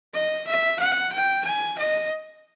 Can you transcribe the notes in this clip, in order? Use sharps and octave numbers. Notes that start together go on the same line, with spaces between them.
D#5
E5
F#5
G5
G#5
D#5